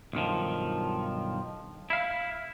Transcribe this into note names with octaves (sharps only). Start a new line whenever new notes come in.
B1 G2 D#3 F3
E4 F5